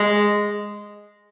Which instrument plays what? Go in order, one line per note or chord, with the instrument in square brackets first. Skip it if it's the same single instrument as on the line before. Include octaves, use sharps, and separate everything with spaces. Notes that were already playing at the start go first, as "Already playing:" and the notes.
Already playing: [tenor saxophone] G#3